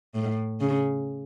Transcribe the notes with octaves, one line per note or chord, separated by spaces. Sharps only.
A2
C#3